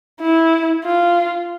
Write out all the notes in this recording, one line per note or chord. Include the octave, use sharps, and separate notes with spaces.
E4
F4